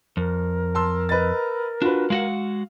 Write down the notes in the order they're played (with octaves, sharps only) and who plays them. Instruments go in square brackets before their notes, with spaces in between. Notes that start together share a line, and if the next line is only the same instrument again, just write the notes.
[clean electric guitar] F2 [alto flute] A#4
[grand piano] A5 C6 E6
B4 D#5 A6
[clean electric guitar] D4 [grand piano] F4 F#4 B4
[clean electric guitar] G#3 F#4 F#5 [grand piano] F5